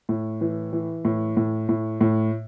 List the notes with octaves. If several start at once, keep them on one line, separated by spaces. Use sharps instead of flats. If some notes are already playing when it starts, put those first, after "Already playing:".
A2
E3
E3
A2
A2
A2
A2